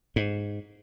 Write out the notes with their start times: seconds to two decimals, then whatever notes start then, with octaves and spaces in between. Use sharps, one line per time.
0.16 G#2